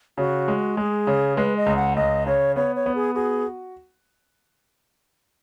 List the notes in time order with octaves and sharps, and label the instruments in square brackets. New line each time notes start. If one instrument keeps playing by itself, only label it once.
[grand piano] C#3 [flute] F#4
[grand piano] G#3
[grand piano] G#3 [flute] G#4
[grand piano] C#3
[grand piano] G#3 [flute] B4
[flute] D#5
[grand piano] C#2
[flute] F#5
[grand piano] C#2 [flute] D#5
[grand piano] C#3 [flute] C#5
[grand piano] B3 [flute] C#5
[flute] C#5
[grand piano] B3
[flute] G#4
[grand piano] F#4 [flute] G#4